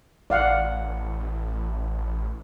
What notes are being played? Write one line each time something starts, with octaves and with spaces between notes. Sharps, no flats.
A1 D5 F5 F#5